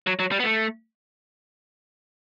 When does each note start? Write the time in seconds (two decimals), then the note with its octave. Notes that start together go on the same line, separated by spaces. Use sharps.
0.07 F#3
0.19 F#3
0.32 G3
0.40 B3
0.44 A3